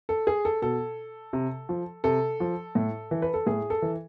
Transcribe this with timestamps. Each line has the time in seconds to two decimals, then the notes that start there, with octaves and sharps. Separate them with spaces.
0.09 A4
0.27 G#4
0.45 A4
0.62 B2 A4
1.33 C3
1.69 F3
2.04 C3 A4
2.40 F3
2.75 A2
3.11 E3
3.22 B4
3.34 A4
3.46 A2 G#4
3.70 A4
3.82 E3